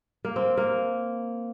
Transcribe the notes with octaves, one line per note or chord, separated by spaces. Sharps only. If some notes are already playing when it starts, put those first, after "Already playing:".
A#3
C4
A#3